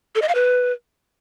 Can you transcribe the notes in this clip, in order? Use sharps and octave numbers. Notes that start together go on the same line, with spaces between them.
A4
D#5
F5
B4